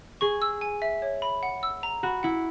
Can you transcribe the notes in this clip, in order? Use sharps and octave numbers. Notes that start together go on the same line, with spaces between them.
G#4 C#6
E6
G#5
E5
C#5
B5
F#5
E6
A#5
F#4 B5
E4 F#5